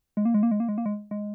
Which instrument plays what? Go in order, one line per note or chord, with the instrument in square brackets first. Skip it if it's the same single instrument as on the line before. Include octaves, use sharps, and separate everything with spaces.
[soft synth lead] G#3
A#3
G#3
A#3
G#3
A#3
G#3
A#3
G#3
G#3